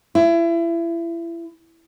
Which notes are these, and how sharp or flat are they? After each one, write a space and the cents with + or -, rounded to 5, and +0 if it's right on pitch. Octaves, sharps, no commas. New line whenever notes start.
E4 +30